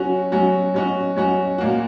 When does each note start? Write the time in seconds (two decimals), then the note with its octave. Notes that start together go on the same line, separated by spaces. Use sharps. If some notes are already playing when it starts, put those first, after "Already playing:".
Already playing: F#3 C#4 F#4
0.32 F#3 C#4 F#4
0.74 F#3 C#4 F#4
1.16 F#3 C#4 F#4
1.58 A#2 A#3 F#4